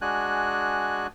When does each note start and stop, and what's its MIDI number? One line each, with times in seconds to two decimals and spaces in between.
0.01 1.07 56
0.01 1.07 62
0.01 1.07 66
0.01 1.07 80
0.01 1.07 90